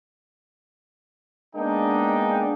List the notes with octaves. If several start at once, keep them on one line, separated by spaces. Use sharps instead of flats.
G#3 A#3 B3 D4 D#4 G5